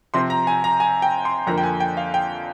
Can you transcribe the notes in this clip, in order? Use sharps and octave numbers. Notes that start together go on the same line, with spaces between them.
C3 F3 C4 C6
A#5
G#5
A#5
G#5
G5
C6
F2 D3 F3 A#3 A#5
G5
G#5
G5
F5
G5